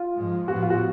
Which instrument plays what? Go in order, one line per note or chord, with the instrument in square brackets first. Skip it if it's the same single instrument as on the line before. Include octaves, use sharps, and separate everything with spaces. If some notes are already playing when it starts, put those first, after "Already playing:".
Already playing: [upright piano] F4
[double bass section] G#2 F3 G#3
[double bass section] A2 F3 B3 [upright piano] F#4
[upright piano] F4
F#4